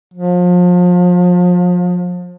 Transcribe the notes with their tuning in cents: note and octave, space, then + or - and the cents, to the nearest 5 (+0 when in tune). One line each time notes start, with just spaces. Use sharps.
F3 +35